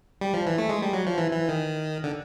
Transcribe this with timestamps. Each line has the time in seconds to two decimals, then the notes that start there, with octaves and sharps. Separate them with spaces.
0.21 G3
0.33 F3
0.46 E3
0.58 A3
0.69 G#3
0.82 G3
0.93 F#3
1.07 F3
1.18 E3
1.31 E3
1.49 D#3
2.04 D3